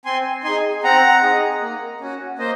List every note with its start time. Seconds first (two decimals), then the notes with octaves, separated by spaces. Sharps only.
0.05 C4 G#5 C6
0.44 D#4 G#4 G#5 C6
0.84 C4 F#5 A#5
1.23 D#4 G#4
1.61 A#3
2.01 C#4 F#4
2.38 A#3 C5 D#5